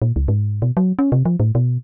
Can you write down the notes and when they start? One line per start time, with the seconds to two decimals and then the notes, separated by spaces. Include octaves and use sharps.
0.02 A#2
0.16 C#2
0.28 G#2
0.62 B2
0.77 F#3
0.99 C#4
1.12 C3
1.25 F3
1.40 A2
1.55 B2